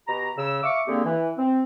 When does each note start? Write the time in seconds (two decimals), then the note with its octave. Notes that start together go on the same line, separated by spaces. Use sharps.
0.08 B2 G4 A#5
0.37 C#3 E6
0.63 E5 F5 C#6 D6
0.87 D3 A#3 C4 G4 G#4
1.05 E3
1.38 C4